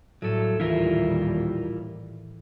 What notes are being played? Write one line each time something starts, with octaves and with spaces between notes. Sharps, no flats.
A1 A2 F#3 G3 A4 D#7
D#2 A#2 E3 G3 E4 F4 A#4 E5